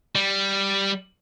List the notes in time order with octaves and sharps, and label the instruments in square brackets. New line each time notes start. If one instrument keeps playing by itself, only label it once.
[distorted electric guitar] G3